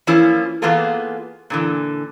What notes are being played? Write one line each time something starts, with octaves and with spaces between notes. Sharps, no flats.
E3 F3 A#3 C#4 E4
E3 A#3 B3 F4 G#4 A4
A#2 D3 E3